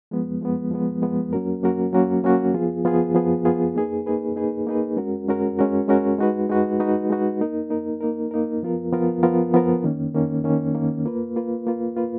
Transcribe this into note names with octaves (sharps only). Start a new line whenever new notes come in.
F3 G#3 B3
F3 G#3 B3
F3 G#3 B3
F3 G#3 B3
F#3 A#3 C#4 F#4 A#4
F#3 A#3 C#4 F#4 A#4
F#3 A#3 C#4 F#4 A#4
F#3 A#3 C#4 F#4 A#4
F3 B3 F4 G#4
F3 B3 F4 G#4
F3 B3 F4 G#4
F3 B3 F4 G#4
A#3 D#4 G#4 B4
A#3 D#4 G#4 B4
A#3 D#4 G#4 B4
A#3 D#4 G#4 B4
G#3 C#4 F#4 A#4
G#3 C#4 F#4 A#4
G#3 C#4 F#4 A#4
G#3 C#4 F#4 A#4
G#3 D#4 F#4 B4
G#3 D#4 F#4 B4
G#3 D#4 F#4 B4
G#3 D#4 F#4 B4
A#3 D#4 A#4
A#3 D#4 A#4
A#3 D#4 A#4
A#3 D#4 A#4
F3 B3 F4 A#4
F3 B3 F4 A#4
F3 B3 F4 A#4
F3 B3 F4 A#4
D#3 A#3 C#4
D#3 A#3 C#4
D#3 A#3 C#4
D#3 A#3 C#4
A#3 F4 B4
A#3 F4 B4
A#3 F4 B4
A#3 F4 B4